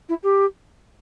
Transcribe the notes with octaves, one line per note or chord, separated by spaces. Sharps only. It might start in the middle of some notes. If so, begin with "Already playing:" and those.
E4
G4